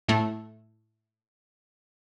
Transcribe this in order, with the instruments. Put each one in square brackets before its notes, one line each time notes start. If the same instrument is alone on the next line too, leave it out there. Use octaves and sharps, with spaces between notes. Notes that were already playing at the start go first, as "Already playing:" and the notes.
[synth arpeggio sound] A2 A3